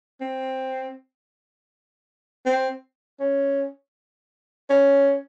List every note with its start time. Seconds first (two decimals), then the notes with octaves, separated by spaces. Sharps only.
0.21 C4
2.46 C4
3.20 C#4
4.70 C#4